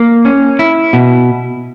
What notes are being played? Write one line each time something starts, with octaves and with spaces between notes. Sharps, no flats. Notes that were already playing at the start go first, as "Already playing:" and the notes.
Already playing: A#3
C#4
E4
B2